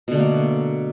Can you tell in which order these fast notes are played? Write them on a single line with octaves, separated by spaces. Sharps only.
B2 D3 A3 A#3